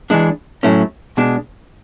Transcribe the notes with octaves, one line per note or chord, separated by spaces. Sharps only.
E3 G#3 D4
A2 F#3 A3 C#4 E4
B2 G#3 D4